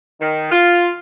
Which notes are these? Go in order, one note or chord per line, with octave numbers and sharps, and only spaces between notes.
D#3
F4